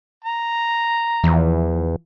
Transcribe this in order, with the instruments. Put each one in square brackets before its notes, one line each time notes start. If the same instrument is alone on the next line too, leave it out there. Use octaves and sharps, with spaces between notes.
[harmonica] A#5
[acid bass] E2 [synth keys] E3 F3